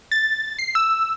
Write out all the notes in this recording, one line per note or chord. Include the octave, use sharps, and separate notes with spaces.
A6
C7
E6